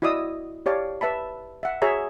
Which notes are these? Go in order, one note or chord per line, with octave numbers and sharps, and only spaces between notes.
E4 F#4 D5 D#5 D#6 E6
G4 C#5 D5 F5 A5
B4 E5 A5 B5
E5 F#5
F#4 G#4 C#5 E5 A#5